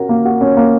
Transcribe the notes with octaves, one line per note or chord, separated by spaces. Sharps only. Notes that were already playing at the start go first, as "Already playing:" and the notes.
Already playing: C#4 F#4 A#4
A#3
F#4
C#4
A#3